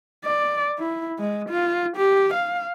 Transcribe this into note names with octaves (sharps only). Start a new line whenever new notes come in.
D5
E4
G#3
F4
G4
F5